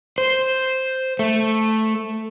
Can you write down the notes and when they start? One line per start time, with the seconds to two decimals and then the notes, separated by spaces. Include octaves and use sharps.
0.18 C5
1.19 A3